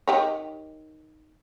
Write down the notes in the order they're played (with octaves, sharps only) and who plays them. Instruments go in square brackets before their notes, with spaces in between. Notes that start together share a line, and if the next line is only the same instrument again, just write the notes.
[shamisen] D#3 G4 C#5